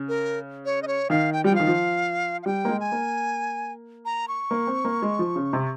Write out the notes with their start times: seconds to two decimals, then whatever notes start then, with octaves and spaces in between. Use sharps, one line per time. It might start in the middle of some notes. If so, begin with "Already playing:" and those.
Already playing: C#3
0.08 A#4
0.65 C#5
0.82 D#5
0.87 C#5
1.10 D#3 F5
1.33 G5
1.44 G3 G5
1.52 F3
1.55 D#3 F5
1.67 F3
2.43 F5
2.46 G3 G5
2.65 A#3
2.69 G#3
2.80 G#5
2.92 A#3
4.05 A#5
4.28 C#6
4.51 A#3
4.67 C4
4.85 A#3
5.02 G#3
5.19 F3
5.36 C#3
5.53 C3